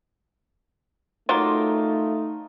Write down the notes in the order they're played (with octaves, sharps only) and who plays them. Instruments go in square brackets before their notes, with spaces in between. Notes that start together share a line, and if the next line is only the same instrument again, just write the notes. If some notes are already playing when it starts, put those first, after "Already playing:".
[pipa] F#3 A#3 F4 [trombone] A3 [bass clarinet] D#4